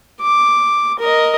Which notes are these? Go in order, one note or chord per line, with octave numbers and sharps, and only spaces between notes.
D6
A#4 D#5